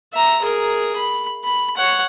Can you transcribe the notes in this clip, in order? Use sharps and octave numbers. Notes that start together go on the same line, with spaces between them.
E5 A#5
G#4 A#4
B5
B5
C#5 F#5